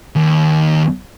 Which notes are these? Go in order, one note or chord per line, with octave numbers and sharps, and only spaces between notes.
D#2